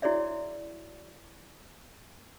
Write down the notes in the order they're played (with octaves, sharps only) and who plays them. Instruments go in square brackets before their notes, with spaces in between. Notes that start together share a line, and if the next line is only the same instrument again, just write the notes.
[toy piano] E4 F#4 G#4 C#5 D5 E5